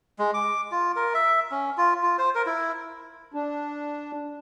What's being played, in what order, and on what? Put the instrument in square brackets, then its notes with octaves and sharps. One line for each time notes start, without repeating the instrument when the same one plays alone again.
[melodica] G#3
D6
F4
A#4
E5
C#4
F4
F4
C5
A#4
E4
[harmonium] D4